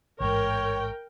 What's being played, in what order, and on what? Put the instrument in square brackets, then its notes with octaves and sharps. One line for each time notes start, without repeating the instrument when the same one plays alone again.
[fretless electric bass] A1 G#2 [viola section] A#4 G5 [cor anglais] C#5